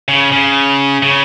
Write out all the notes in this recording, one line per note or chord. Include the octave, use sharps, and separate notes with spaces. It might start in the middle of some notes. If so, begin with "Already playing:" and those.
C#3
C#3
C#3